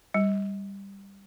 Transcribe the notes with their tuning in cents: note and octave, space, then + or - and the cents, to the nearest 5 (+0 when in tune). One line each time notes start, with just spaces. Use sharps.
G3 +10